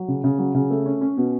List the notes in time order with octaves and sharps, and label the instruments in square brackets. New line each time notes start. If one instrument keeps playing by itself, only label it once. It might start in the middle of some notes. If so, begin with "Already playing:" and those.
Already playing: [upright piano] F#3
C#3
C#3
F#3
C#3
A3
C#4
C#4
B2